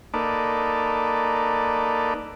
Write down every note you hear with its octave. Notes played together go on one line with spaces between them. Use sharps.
A#3 D#4 A4 B4 D5